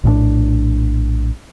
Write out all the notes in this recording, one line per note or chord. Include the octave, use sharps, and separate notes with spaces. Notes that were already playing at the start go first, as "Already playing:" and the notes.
A#1 A2 C#3 D4